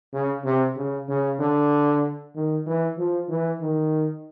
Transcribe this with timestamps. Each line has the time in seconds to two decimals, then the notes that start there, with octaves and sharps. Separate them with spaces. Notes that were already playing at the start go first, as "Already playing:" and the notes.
0.13 C#3
0.44 C3
0.76 C#3
1.09 C#3
1.40 D3
2.35 D#3
2.67 E3
2.98 F3
3.29 E3
3.61 D#3